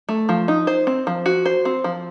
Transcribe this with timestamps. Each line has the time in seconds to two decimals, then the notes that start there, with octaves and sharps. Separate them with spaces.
0.09 A3
0.29 F3
0.48 D#4
0.67 C5
0.87 C4
1.07 F3
1.26 F#4
1.45 C5
1.65 C4
1.84 F3